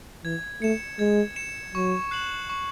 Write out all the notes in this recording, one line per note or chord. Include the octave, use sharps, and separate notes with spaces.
E3 G#6
A3 C#7 E7
G#3 G#6
C#7 E7
F#3 C#6
F#6 C7 F#7
C#6